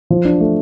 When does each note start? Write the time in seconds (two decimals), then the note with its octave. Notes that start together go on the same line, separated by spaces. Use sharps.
0.10 F3
0.25 D4
0.40 A3